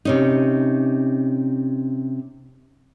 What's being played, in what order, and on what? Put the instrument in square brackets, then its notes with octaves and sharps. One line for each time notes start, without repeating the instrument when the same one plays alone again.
[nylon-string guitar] C3 C#4 D#4